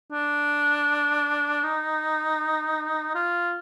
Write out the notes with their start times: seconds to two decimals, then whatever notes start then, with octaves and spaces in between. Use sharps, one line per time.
0.11 D4
1.64 D#4
3.15 F4